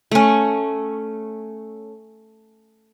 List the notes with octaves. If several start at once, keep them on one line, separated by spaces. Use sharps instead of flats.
A3 C#4